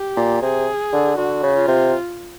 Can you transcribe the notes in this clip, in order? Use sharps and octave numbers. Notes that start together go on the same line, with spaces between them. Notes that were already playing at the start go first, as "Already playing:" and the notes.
Already playing: G4
A#2
C3 G#4
D3
D3 F#4
C#3
F4
C3